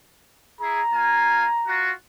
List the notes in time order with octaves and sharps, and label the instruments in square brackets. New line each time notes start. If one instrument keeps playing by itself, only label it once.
[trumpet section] E4 G#4 [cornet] A#5
[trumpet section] A#3 F4 G#5
F4 F#4